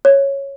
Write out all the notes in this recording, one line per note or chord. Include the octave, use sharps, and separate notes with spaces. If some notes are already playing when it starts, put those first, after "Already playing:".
C#5